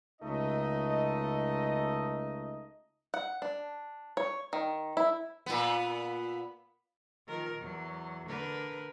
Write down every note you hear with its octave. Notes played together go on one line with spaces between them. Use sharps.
C#2 A3 D#4 D#5
F#5
D4
C#5
D#3
E4
A#2 B3
D#3 F3 A#4
E2 F#3
D3 A#4 B4